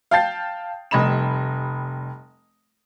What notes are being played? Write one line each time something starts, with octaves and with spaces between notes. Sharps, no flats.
F5 G5 A5 G6 A6 C7
F1 G3 D#5 B5 E7